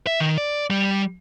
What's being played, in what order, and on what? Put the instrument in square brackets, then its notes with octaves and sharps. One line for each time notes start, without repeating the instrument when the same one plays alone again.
[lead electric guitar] E5
D#3
D5
G3